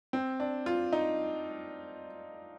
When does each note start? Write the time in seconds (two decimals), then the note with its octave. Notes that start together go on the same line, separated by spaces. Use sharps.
0.13 C4
0.40 D4
0.66 F4
0.93 D#4